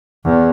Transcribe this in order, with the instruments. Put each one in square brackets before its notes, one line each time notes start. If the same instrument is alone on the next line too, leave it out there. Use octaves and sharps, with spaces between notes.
[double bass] E2